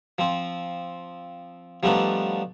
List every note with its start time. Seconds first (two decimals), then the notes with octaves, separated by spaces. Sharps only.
0.18 F3 C4
1.83 F3 G3 A3 B3 D4 D#4